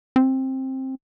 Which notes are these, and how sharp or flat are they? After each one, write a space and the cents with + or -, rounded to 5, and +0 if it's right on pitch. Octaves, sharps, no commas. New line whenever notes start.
C4 +15